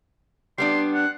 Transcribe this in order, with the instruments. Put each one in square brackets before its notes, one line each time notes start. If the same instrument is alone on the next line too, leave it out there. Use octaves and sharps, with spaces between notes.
[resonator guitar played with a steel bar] G3 B3 D4 [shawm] C6
[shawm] F#5